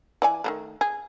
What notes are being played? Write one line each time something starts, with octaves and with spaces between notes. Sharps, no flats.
E3 D5 G#5
D#3 G3 A3
G#4